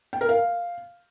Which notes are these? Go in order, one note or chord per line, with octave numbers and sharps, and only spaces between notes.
G5
A#4
F5